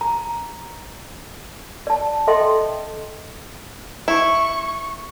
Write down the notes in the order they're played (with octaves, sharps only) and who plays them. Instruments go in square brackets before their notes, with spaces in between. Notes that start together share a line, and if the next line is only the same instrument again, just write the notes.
[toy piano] A#5
D5 A5
A4 D#5 E5 G5 C6
[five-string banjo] E4 [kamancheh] C#6